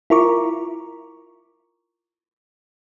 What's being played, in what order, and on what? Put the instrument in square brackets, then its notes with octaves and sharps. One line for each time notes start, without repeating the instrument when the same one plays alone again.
[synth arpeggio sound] E4 F4 A#4 A#5 C#6 D6